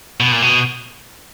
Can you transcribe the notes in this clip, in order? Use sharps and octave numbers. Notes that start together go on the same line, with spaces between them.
B2
A#2
B2